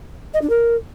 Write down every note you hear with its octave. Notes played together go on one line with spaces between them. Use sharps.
D#5
D4
A#4